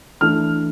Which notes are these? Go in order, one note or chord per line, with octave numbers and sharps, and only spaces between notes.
E3 A3 D4 F6